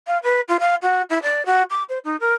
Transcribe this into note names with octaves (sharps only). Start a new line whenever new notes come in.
F5
B4
F4
F5
F#4
E4
D5
F#4
D6
C5
D#4
A#4